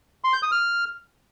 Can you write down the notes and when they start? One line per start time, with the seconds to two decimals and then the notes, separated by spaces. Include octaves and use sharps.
0.24 C6
0.33 G6
0.42 D#6
0.52 F6